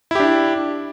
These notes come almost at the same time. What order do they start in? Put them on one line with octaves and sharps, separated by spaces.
E4 G4 D4